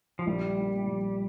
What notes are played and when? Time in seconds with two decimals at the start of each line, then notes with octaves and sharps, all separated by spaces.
0.19 F3
0.27 A#1 G3
0.56 A#2 A3
0.87 A#1